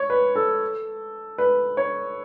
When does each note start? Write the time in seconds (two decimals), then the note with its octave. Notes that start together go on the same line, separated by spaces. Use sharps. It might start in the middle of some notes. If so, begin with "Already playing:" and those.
Already playing: C#5
0.10 B4
0.36 A4
1.38 B4
1.77 C#5